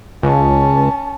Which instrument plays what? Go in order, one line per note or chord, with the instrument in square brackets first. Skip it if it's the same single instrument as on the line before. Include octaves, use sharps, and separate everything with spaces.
[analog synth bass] C#2 [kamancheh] C#4 A5